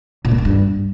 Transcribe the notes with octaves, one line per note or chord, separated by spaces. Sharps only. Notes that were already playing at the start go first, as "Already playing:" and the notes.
A#2
A3
B3
G2